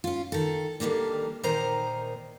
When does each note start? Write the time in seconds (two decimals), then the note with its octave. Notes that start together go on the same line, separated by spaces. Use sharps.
0.04 C#4 F4
0.32 D#3 A4
0.80 D3 D#3 G3 A#3 D4
1.43 A#2 D#3 D#4 A#4 C5 A#5